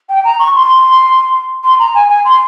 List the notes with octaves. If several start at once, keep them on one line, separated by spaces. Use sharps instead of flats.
G5
A#5
C#6
C6
C6
A#5
G#5
G#5
C6